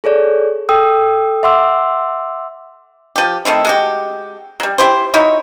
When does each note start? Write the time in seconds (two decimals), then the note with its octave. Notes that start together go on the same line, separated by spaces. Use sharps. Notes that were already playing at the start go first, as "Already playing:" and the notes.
0.04 G#4 A4 C#5 D5
0.69 A4 G5 D#6 E6
1.43 E5 F#5 C6 D6 E6
3.16 F3 G4
3.45 D#3 A3 C4 E4
3.65 G#3 F#4 G4
4.60 F#3 G3
4.78 E4 G4 C5
5.14 D#4 E4 F#4 C#5